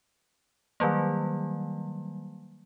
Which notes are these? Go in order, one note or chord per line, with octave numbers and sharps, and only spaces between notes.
D#3 F#3 G3 A#3